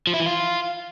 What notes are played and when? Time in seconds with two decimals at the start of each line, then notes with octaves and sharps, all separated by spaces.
0.07 F3
0.13 E4
0.20 E3
0.26 F4